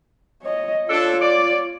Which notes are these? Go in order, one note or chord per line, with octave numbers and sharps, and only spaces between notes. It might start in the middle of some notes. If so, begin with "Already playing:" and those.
C#5 D#5
D4 F4 A4 C#5
D5